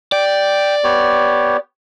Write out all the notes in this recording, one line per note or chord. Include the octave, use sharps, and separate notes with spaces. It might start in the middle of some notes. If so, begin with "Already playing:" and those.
D5 G5
B3 G4 C#5